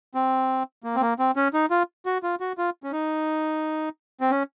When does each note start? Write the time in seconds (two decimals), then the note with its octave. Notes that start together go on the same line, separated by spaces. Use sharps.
0.15 C4
0.84 A#3
0.96 C4
1.02 A#3
1.19 C4
1.36 C#4
1.54 D#4
1.71 F4
2.06 F#4
2.23 F4
2.40 F#4
2.58 F4
2.83 C#4
2.92 D#4
4.21 C4
4.31 C#4